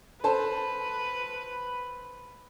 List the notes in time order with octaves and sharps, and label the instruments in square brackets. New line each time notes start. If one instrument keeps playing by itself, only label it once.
[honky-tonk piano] A4 C5 A5 [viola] B4